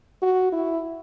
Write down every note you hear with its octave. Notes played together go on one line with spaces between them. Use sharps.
F#4
E4